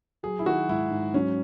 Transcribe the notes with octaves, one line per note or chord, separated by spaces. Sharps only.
F#3 G#4
E4
D#3 F#4
G#2 E4
G#2
F#3 C#4